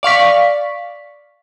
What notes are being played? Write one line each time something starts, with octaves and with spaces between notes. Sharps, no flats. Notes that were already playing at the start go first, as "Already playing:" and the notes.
D5 F5 C#6 B6